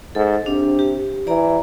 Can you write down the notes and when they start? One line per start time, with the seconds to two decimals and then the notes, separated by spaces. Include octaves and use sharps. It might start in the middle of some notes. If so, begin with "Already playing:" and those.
0.15 G#2 A4
0.46 C3 D4
0.79 G4
1.27 E3 D5 A#5